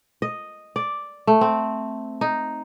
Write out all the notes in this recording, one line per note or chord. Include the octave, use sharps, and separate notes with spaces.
D#5
D5
A3
C4
D#4